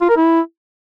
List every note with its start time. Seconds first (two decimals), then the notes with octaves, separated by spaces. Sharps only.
0.01 F4
0.09 A#4
0.17 E4